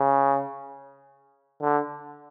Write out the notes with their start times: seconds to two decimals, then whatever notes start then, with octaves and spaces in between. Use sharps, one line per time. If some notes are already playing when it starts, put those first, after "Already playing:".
Already playing: C#3
1.62 D3